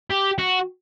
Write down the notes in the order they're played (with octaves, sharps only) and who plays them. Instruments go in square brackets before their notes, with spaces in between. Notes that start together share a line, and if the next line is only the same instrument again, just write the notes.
[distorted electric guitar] G4
F#4